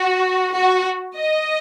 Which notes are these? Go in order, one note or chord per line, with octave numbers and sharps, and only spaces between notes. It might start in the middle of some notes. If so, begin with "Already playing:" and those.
Already playing: F#4
F#4
D#5